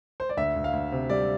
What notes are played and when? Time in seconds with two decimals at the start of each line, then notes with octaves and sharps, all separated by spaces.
0.20 C5
0.29 D5
0.37 D2 E5
0.56 D2
0.64 F5
0.73 D2
0.92 C3
1.10 G3 D5